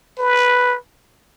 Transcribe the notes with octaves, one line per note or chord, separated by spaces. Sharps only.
B4